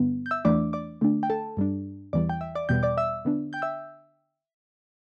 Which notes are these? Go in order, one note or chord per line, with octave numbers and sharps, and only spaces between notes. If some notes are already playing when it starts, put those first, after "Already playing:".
Already playing: G2 D3 B3
G6
E5 E6
E2 E3 A3 D4 D5 D6
D5 D6
D3 A3 D4
G5
A4 A5
G2 G3 D4
E2 E3 G3 D5
G5
E5
D5 D6
E2 B2 G3 B3 G5 G6
D5 D6
E5 E6
D3 B3 D4
G5 G6
E5 E6